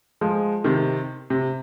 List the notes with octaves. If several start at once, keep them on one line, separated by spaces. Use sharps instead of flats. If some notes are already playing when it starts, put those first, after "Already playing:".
F3 G#3
C3 D#3
C3